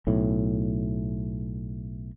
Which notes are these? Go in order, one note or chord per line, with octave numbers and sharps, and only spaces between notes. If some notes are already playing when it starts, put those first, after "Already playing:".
B1 A2